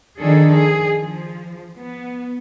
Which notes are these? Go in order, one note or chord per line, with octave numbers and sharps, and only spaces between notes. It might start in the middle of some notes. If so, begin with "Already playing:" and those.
D#3 F3 D4 G#4 A4
G#4
F3
B3